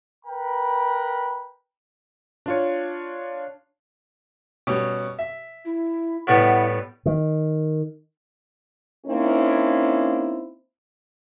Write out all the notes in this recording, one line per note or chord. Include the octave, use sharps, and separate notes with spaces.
A#4 B4 G5 B5
D4 F4 C#5
B2 G3 C#4
E5
E4
A2 G3 B3 E4 F#5
D#3
A#3 C4 C#4 D#4 E4